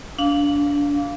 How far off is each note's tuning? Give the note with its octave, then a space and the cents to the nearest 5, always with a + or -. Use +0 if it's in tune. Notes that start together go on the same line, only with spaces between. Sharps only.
D4 -25 F5 +0